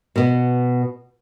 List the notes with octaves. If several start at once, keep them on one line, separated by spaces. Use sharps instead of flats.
B2 B3